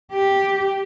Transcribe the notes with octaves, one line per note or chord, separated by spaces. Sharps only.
G4